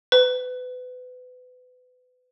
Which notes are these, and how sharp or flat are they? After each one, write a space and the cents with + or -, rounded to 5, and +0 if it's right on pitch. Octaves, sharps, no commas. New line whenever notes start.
B4 +30